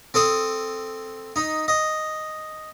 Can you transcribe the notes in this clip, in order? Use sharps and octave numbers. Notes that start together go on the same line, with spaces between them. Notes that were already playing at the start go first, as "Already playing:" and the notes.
C4 A4 D#6
D#4
D#5